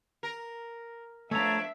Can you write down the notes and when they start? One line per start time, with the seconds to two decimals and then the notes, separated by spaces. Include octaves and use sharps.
0.23 A#4
1.31 F3 A3 B3 D4 A4 C#5 E5 A#5